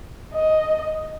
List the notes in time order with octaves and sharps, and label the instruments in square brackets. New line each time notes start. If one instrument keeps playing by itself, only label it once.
[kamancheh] D#5